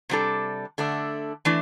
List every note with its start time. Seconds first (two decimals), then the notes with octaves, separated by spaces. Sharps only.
0.10 C3 G3 D4 A4
0.78 D3 A3 D4
1.45 E3 A3 D4